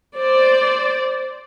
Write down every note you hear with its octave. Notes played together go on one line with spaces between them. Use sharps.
C5 D5